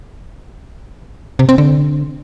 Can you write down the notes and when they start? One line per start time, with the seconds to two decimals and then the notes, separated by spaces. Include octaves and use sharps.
1.39 C3
1.49 C4
1.58 D3